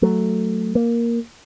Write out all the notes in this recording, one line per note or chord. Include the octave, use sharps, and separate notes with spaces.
F#3 A3
A#3